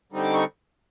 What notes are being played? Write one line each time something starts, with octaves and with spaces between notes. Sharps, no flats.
D3 G3 C4 D#4
D6
C#6